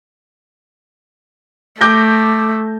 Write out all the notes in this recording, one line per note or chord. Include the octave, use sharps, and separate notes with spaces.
A3 D6 G6 A#6